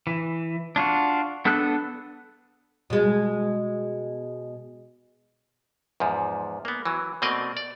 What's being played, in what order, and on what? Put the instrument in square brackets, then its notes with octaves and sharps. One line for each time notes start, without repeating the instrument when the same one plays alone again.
[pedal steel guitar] E3
D4 F4 F#4
B3 D4 A4 E6 F#6
[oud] B2 G#3
[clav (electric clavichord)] E2 G#2 F3
A#3 B3
E3 F#3
B2 A3 A#3 C4 D5 D#5
D5